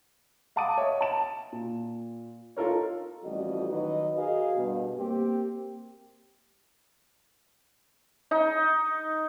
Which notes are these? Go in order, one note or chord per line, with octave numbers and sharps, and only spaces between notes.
F5 F#5 A5 D6 D#6 D#7
C#5 D#5 E5
A5 E7
A#2
D#4 F4 A4 A#4 C#5
A1 F2 G3 F#4 D#5
D#3 F#3 D#4 B4 D#5
F#4 G#4 A#4 D#5 F5
G2 B2
A#3 C4 G4
D#4